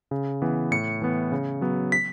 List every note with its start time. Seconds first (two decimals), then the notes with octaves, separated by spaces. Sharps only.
0.11 C#3
0.42 E3 B3
0.71 A2 C#7
1.02 E3 B3
1.32 C#3
1.61 F#3 B3
1.92 B6